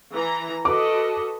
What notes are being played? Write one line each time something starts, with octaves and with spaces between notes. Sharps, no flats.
E3 A#5
F#4 A4 B4 D#5 D6